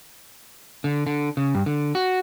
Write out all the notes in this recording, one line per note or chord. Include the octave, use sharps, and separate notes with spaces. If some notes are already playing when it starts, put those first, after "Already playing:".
D3
D3
C#3
G2
D3
F#4